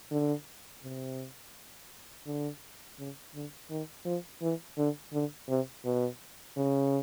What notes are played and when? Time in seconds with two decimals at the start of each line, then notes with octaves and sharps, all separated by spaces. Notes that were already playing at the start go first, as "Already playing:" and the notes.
0.11 D3
0.83 C3
2.26 D3
2.99 C#3
3.34 D3
3.70 D#3
4.05 F3
4.42 E3
4.78 D3
5.13 D3
5.49 C3
5.85 B2
6.57 C#3